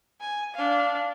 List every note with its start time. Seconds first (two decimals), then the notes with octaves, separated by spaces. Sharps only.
0.20 G#5
0.54 D4 F5